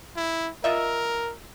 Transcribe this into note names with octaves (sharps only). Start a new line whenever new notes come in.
E4
F4 A#4 D#5 E5